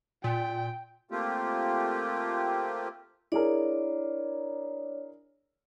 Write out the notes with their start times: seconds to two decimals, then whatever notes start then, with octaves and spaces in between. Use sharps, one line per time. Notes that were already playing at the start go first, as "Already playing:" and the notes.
0.24 A#2 G5
1.11 A3 A#3 C4 F4 G4
3.32 D4 E4 G#4 A#4 C#5 D5